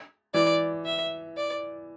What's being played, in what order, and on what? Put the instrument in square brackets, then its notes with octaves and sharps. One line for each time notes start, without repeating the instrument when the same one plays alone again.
[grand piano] E3 [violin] D5
[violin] E5
D5